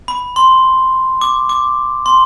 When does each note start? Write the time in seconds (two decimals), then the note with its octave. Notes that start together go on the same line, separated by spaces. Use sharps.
0.08 B5
0.36 C6
1.21 D6
1.49 D6
2.06 C6